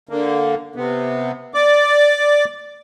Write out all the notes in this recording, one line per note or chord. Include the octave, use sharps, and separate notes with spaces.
D3 A#3
C3 B3
D5 D6